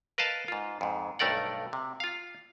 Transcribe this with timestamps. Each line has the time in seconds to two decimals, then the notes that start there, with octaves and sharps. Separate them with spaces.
0.18 A#4 B4 D#5 F5 A5
0.48 G#2 F4
0.81 F2 G#2
1.19 B1 G2 A3 A#4 D5 F#5
1.73 C3
2.00 F4 F5